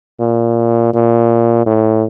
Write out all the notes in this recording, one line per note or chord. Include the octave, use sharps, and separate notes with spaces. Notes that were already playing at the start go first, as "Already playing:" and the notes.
A#2
A#2
A2